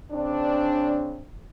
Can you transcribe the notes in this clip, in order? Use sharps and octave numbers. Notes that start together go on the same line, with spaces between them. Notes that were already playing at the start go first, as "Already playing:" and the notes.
C#3 C4 D4